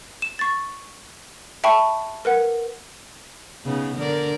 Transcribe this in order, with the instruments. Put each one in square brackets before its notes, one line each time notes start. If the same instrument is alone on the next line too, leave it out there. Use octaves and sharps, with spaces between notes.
[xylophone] E7
C#6 A6
E5 G5 A5 B5 C#6
A#4 B4 F#5
[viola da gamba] C#3 B3 D#4
D3 A#4 D5